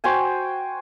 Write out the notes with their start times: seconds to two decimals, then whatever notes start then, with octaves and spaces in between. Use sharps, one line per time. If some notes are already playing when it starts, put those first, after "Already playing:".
0.04 F#4 C5 G5 G#5